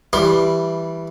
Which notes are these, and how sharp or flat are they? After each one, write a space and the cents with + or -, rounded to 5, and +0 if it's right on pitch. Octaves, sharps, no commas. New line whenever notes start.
E3 +0 G3 +0 C6 +25